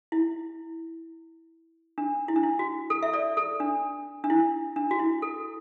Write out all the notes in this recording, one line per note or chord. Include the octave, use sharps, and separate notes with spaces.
E4
D4
E4
D4
E4
F#4
A4
E5
A4 D5
A4
D4
D4
E4
D4
F#4
E4
A4